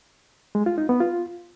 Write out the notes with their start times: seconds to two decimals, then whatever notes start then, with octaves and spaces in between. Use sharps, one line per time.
0.55 G#3
0.66 F4
0.78 D#4
0.89 B3
1.01 F4